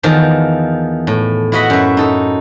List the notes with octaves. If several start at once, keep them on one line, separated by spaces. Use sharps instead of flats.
E2 D#3 F3
A2
E4 F#4 D#5 F#5 B5
F#2 E5
D#4 A4